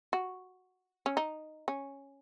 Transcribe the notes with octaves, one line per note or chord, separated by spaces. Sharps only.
F#4
C#4
D#4
C#4